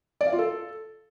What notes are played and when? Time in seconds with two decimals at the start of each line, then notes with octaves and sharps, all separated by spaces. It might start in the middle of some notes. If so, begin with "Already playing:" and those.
0.21 D5
0.27 F5
0.33 F4
0.38 A4